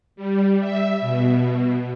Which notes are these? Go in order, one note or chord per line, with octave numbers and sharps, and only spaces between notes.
G3
E5
B2